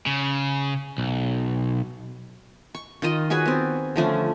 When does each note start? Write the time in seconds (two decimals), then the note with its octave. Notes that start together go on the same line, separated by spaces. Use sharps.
0.06 C#3
0.98 B1
2.75 C#6
3.02 D#3 F4 D#5
3.30 F#4 G#4 B4 C#5
3.46 B3 C4
3.96 D3 F3 A3 C#4